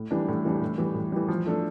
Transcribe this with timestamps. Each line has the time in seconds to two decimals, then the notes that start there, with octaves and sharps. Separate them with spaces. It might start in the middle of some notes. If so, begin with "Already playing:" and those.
Already playing: A2
0.11 E3 G3 D4
0.28 A2
0.45 E3 G3 D4
0.61 A2
0.78 E3 G3
0.95 A2
1.12 E3 G3
1.28 F3
1.46 A3 D4 A4